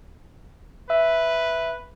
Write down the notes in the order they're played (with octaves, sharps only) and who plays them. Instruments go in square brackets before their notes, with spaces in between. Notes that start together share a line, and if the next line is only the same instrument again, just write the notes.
[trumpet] B4 [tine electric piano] E5